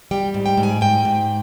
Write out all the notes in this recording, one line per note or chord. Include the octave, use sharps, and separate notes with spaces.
G3 G5
G#2
G5
G#2
G#5
G#2 G5
G#2